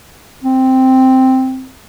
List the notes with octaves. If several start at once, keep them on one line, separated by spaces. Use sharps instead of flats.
C4